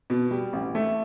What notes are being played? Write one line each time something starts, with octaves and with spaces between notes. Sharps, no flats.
B2
G3
A1
A3